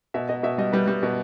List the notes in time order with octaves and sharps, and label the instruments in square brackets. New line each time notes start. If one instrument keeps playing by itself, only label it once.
[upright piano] B2 E5
B2 D#5
B2 E5
G3 D#5
G3 B4
G3
B2